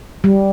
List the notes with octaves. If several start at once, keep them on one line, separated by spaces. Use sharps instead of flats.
G3